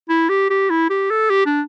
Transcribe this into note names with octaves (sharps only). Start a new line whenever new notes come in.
E4
G4
G4
E4
G4
A4
G4
D4